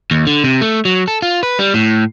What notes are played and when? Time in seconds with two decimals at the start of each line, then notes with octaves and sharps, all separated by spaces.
0.11 D#2
0.27 D3
0.44 C3
0.61 A3
0.85 F#3
1.08 A4
1.22 F4
1.43 B4
1.59 G3
1.74 A2